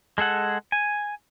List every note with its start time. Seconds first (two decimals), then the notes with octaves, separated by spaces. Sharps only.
0.18 G#3 G#4 A4 F#5
0.72 G#5